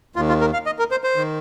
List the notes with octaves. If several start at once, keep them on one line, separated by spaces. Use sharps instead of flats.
D#2 D#3 F4
F4
A#4
F5
D#5
A#4
C5
C5
D#3